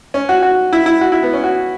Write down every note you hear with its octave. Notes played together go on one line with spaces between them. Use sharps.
C#4
F#4
F#4
E4
E4
F#4
E4
B3
C#4
F#4